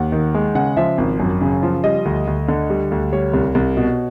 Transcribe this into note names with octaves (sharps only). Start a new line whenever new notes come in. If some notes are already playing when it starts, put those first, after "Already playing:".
Already playing: D#2 F#5
D#3
G#3
C#3 F#5
F3 E5
G#1
F#2
C#3
F3
G3 D#5
D2
D2
D3
G3
D2
G3 C#5
C2
C2
B2